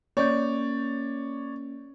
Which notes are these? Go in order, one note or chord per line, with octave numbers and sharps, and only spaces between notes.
A#3 C#4 C#5 D5 G6